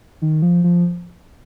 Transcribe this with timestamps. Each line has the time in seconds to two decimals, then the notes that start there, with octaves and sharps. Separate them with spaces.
0.22 D#3
0.42 F3
0.64 F3